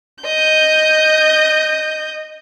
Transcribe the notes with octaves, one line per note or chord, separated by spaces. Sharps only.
D#5 G6